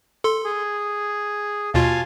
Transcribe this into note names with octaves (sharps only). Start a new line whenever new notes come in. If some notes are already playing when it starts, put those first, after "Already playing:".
A4 C6
G#4
D#2 B2 F4 F5 G#5 A5